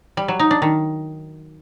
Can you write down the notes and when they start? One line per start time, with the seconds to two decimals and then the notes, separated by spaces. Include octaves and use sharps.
0.17 G3
0.28 F#3
0.40 D#4
0.51 D4
0.62 D#3